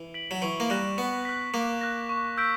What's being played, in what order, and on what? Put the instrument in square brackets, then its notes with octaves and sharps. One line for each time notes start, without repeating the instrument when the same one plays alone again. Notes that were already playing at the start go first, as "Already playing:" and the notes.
Already playing: [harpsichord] E3
[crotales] B6 D7 F#7
[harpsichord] F#3
[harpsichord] E3 [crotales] C#6
[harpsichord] A#3
[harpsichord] G3 [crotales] F#6 A#6 E7
[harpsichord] B3 [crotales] C#6
[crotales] F#6 B6
[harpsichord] A#3 [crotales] D6
[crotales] F#6 A#6
C#6
E6 G6 B6 D7